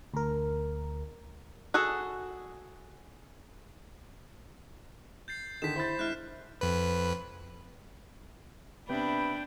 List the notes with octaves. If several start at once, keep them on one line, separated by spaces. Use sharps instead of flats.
D2 A#4
F#4 G#4 A4
G6 A6 C7
D3 D#3 B6 E7
E4 C5 B5 A6
G#3 D4 E4 F6 F#6
F2 B4
C3 B3 D4 B4 E5 G5 B5